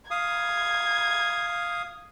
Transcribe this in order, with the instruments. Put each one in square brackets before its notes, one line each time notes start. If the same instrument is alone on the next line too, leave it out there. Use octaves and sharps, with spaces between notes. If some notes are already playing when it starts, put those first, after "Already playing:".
[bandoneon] F5 D#6 [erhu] G#6